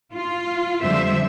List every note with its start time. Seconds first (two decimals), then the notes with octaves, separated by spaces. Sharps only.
0.13 F4
0.83 F2 D3 G3 G#3 C5 E5